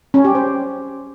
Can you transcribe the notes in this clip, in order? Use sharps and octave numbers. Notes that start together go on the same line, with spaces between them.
C#4
G4
C5